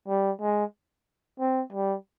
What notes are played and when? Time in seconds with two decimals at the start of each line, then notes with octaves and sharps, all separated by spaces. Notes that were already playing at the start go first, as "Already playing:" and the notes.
0.08 G3
0.42 G#3
1.40 C4
1.73 G3